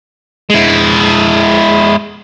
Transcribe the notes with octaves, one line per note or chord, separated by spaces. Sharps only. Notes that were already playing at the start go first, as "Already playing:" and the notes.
G#3 E4